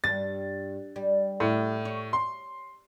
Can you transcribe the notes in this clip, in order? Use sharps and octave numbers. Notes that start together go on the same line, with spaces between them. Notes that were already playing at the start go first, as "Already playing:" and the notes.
G2 A6
G3
A2
C#5
C6